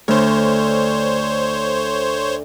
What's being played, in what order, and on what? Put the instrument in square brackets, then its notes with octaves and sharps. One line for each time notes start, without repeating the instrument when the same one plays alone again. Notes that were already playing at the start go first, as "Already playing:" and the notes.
[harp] D2 [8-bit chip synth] C5 C#5